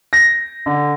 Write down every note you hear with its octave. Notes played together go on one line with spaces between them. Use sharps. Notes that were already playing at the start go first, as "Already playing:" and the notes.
A#6
D3